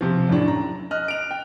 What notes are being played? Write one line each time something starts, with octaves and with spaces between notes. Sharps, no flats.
C3 F3
F#2 A2 D4
A#5
D#5 F6 F#6
D7 F7
G5